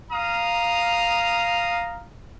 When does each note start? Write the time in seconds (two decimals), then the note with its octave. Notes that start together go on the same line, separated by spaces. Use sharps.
0.10 F5 A#5 D#6